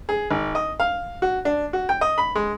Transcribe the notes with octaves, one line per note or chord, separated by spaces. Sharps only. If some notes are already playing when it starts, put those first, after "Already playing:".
G#4
G#1
D#5
F5
F#4
D4
F#4
G5
D#5
B5
G#3